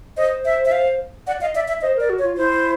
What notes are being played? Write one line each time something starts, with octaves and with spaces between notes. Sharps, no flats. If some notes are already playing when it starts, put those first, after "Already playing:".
C5 D#5
E5
E5
F5
D5 F#5
D#5 F5
D5 E5
E5
C5 D#5
A#4 D5
F#4
C#5
F4
E4 C5